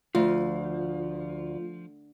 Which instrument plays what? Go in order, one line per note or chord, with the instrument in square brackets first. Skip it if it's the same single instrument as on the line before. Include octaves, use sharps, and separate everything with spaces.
[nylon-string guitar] D2 [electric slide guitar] F3 [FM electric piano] F4